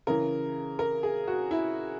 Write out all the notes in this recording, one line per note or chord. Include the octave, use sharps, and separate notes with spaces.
C#3 E3 A#4
A#4
G#4
F#4
E4